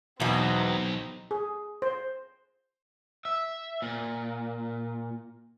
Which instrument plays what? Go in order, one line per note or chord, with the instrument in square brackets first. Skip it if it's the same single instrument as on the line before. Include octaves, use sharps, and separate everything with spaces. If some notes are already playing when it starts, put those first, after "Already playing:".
[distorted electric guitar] B1 [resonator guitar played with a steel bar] E2 B2 [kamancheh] C4 D#4
[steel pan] G#4
C5
[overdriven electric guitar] E5
A#2